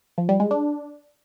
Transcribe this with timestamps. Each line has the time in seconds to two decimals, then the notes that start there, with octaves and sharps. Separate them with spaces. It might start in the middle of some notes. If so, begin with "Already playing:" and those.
0.18 F3
0.29 G3
0.40 G#3
0.51 D4